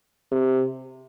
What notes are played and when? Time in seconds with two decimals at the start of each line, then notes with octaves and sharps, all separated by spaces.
0.32 C3